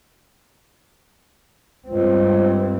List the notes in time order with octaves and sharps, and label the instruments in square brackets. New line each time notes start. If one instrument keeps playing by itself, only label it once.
[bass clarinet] C#2 [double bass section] G2 C4